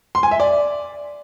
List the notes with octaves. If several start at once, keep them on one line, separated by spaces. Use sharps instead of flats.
C6
G#5
E5
D5